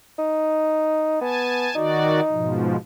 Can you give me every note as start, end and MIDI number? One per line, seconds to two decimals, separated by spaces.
0.19 1.18 63
1.21 1.69 59
1.21 1.75 80
1.21 1.75 81
1.75 2.20 51
1.75 2.59 63
1.75 2.20 66
1.75 2.20 74
2.30 2.76 44
2.30 2.76 47
2.30 2.76 53